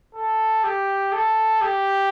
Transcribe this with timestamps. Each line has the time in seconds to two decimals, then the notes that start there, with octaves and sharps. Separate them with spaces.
0.15 A4
0.64 G4
1.13 A4
1.61 G4